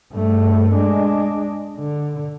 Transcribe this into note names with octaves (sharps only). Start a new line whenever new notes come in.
G2 A3
G#3 D4
D3